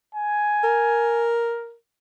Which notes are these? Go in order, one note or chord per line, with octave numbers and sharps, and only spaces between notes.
G#5
A#4